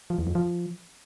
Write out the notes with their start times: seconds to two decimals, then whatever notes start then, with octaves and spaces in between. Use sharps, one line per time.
0.10 F3
0.18 E2
0.27 F2
0.35 F3